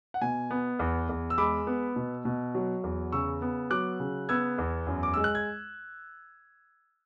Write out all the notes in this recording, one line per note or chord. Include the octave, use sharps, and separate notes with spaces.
F#5
B2 G#5
B3
E2
E2
E6
G#3 B5 D6
B3
B2
B2
F#3
E2
C#3 C#6 E6
B3
F#3 D6 F#6
C#3
B3 E6 G#6
E2
F#2
D6
G#3 E6
F#6
G#6